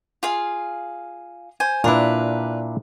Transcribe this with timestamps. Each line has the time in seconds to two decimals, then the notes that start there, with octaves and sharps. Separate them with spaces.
0.23 F4 G#4 F5
1.60 C5 G#5
1.84 A#2 D4 E4 A#4 B4